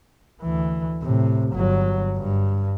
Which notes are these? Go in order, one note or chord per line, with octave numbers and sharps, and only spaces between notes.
D2 E3
A2 C3
G1 F#3
G2